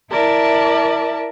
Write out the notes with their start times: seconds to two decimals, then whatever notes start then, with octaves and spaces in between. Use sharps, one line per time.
0.11 E4 A#4 D5 E5 A5